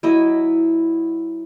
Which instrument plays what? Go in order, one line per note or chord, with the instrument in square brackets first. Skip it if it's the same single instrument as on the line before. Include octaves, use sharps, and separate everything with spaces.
[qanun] F#3 E4 D#5